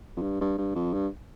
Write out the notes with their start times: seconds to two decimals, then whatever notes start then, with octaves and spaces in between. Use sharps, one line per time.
0.17 F2
0.22 G2
0.41 G2
0.58 G2
0.75 F2
0.94 G2